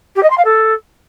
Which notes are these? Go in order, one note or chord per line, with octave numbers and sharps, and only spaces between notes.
G4
D#5
C6
F5
A4